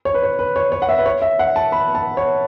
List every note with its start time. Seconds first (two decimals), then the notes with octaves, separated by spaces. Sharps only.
0.05 C#5
0.14 B4
0.23 C#5
0.39 B4
0.56 C#5
0.72 C#5
0.82 F#5
0.89 E5
0.99 B4
1.06 C#5
1.22 E5
1.39 F#5
1.56 A5
1.72 B5
1.95 A5
2.17 C#5